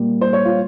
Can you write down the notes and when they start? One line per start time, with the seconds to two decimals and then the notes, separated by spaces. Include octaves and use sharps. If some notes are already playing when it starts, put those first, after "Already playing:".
Already playing: A#2 G3 A#3
0.21 C5
0.33 C#5
0.45 F4